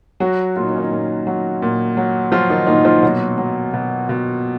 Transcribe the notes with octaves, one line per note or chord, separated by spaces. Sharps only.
F#3 F#4
A#2 F4
D#4
C#4
D#3 D#4
A#2
F#3
A#2
F#3
F3 F#3 F4
D#3 D#4
A#2 D#3 D#4
F3 F4
B2 F#3 F#4
F#3
B2
B2